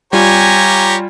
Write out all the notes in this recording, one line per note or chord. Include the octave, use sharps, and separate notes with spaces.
G3 F4 G4 C#5 G#5 A#5